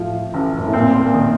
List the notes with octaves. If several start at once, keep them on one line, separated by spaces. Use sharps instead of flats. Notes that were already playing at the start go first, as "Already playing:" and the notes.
Already playing: A2 F3
A1
F#2
A2
A#2 C4
A#2
D#3